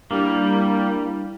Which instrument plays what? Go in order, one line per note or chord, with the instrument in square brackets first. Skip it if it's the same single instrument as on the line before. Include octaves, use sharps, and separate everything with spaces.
[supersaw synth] G3 [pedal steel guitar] A#3 [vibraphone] D4 E4